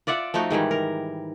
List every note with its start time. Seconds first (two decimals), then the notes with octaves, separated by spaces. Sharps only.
0.07 F4 D5 E5 F#5
0.34 F3 A3 D#4 F#4
0.51 G#2 D#3 E3 G3
0.71 A#4